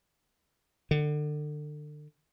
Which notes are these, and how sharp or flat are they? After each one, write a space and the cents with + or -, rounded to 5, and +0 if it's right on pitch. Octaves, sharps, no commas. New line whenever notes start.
D3 +30